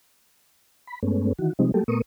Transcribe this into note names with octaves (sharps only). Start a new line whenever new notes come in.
B5
G2 G#3 A3 B3 C#4
D#3 E3 F#4
C3 F3 G3 G#3 C4 D#4
F#3 G3 A3 A#3 G4 A4
A#2 A3 B3 A#4 C#6 D#6